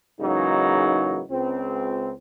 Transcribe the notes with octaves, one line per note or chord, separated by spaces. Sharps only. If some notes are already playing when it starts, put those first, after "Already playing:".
G#2 C#3 E3 F#3 A#3 D#4
C#2 C4